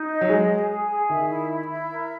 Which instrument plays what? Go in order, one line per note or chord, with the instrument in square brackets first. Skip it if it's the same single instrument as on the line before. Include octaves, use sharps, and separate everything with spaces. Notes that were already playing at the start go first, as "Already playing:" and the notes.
Already playing: [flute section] D#4
D#5
[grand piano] F#3
[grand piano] G#3 [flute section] G#4
[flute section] G#4
G#4
G#4
[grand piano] D#3 [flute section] E5
[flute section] E4
E4
E5
A#4